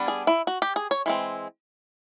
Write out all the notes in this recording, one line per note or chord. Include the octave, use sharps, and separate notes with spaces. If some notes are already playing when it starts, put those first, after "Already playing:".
Already playing: G3 B3 D4
G#4
E4
F#4
G4
G#4
C#5
E3 G#3 C4